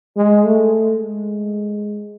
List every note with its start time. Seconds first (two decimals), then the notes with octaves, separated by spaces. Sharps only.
0.17 G#3
0.44 A3
1.00 G#3